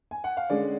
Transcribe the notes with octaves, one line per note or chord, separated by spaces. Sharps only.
G#5
F#5
F5
D3 G#3 C#4 D5